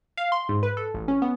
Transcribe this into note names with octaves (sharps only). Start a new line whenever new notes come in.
F5
C6
G#2
B4
A4
A1
C#4
B3